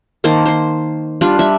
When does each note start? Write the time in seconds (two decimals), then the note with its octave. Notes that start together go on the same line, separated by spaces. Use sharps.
0.24 D#3 A#3 C5 A5
0.46 C5 C6
1.21 G3 D4 F4
1.39 G3 E5